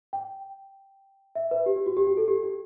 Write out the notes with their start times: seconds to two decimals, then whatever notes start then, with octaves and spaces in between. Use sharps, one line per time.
0.13 G5
1.35 E5
1.51 B4
1.66 G4
1.76 G4
1.86 F#4
1.97 G4
2.07 G4
2.17 A4
2.28 G4
2.43 G4